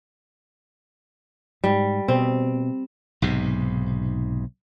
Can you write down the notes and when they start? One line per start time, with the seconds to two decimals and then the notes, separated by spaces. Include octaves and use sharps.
1.64 G#2 G3
2.08 B2 C4
3.22 B1 G#2 C3